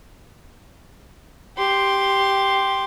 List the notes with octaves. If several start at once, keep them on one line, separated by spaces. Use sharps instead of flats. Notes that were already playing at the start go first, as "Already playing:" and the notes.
G4 C6